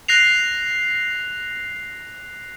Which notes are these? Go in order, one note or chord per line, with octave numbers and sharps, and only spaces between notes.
F#6 A#6 C7 F7